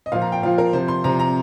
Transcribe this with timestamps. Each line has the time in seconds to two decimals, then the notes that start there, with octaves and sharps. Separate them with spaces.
0.06 D#5
0.12 A#2 F3 F5
0.22 A#5
0.32 G5
0.42 A#2 F3 F5
0.58 A#4
0.73 C3 F3 C5
0.88 C6
1.04 C3 F3 A#5
1.19 A#5